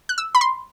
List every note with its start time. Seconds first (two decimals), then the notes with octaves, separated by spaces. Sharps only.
0.09 F#6
0.18 E6
0.35 B5
0.41 C6